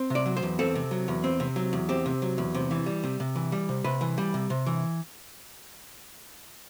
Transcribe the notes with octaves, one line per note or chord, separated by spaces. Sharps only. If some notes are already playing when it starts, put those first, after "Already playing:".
Already playing: C4
C3 D5
F#3
C5
E2
C4 A4
C3
F#3
E2
C4
C3
F#3
E2
C4 G4
C3
F#3
E2
C3
E3
G3
C3
C3
E3
G3
C3
C3 B4
E3
G3
C3
C3
E3